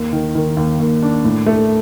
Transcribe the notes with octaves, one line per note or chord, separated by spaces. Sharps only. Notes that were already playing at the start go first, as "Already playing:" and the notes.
Already playing: D#2
D#3
D#3
D#2
D#2
D4
A2
A3